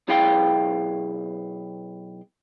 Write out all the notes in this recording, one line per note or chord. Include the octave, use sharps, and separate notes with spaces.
B1 E4 G#4 F5 G5 C6